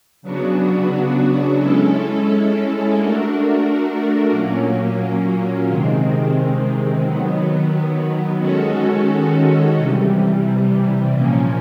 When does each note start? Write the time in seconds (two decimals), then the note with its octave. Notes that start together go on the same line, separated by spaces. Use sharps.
0.22 C#3 F#3 B3 D4 F#4
1.58 G#3 C#4 E4 A4
2.94 A3 D4 F#4 A#4
4.30 A#2 F#3 A#3 C#4
5.67 C3 D#3 G#3 C4
7.03 D#3 F#3 B3
8.39 D#3 G#3 C#4 F#4 A4
9.76 C3 E3 G3
11.11 A#2 F3 A#3 C#4